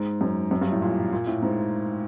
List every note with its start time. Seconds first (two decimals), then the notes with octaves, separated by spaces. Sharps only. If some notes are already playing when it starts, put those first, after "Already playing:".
Already playing: G#2
0.21 F#2
0.51 F#2
0.61 G2
0.72 A2
0.82 A#2
1.12 A#2
1.27 A2
1.42 G#2